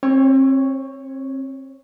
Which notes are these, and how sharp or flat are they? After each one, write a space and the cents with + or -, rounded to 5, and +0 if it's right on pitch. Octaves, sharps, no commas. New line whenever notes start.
C4 +35 C#5 +0